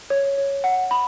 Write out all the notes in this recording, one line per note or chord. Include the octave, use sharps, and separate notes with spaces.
C#5
C#5
F#5
B5